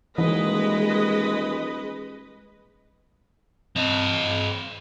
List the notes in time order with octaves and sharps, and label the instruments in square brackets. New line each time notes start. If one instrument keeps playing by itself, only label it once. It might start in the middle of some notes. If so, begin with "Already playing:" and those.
[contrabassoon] D#1 [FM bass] E3 [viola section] G#3 B4 D#5
[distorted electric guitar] C4 D#5